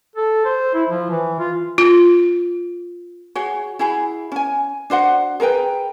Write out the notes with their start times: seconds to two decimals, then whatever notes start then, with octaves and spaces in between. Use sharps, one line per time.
0.16 A4
0.45 C5
0.74 E4
0.90 F3
1.10 E3
1.40 F4
1.78 F4
3.35 F#4 G#4 C#5
3.79 E4 F#4 G#4 B5
4.32 C#4 G#5
4.90 D4 F#4 C5 F#5
5.40 G#4 A#4 B4 G5